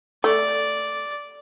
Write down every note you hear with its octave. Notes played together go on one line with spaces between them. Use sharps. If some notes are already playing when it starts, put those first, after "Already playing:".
A3 D5